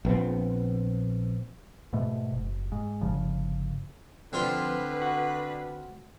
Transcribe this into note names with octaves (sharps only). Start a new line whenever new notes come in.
A#1 B3 C4
G#2 B2 A3
F#1
G#2
G1 C#3 F3
F2 D3 F3 C4 F4 B4 C5
F#4